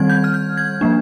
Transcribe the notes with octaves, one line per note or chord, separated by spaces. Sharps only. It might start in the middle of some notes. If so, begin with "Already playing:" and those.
Already playing: D#3 G3 C4 G#6
G6
F6
G6
G#6
F3 A#3 D4